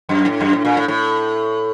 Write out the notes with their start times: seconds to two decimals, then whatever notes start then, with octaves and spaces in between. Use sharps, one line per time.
0.09 F#2
0.25 A2
0.41 F#2
0.53 A2
0.65 A#2
0.77 A2
0.88 A2